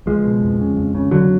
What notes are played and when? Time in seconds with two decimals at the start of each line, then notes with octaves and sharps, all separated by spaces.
0.06 C#2 F3 G#3
0.24 B2
0.41 F2
0.59 C#3
0.76 F2
0.95 C#3
1.11 F2 D3 F#3